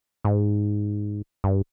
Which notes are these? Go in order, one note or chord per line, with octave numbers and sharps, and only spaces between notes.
G#2
G2